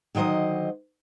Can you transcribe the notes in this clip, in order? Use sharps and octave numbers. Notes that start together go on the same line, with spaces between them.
D3 D#3 F#3 C5 D#5